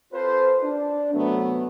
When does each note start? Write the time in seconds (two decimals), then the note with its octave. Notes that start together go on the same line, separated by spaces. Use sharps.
0.13 C4 F4 A4 B4 C5
0.62 D4
1.13 C3 F#3 A3 B3